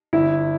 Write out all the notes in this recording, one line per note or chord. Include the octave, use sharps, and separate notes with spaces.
G1 E4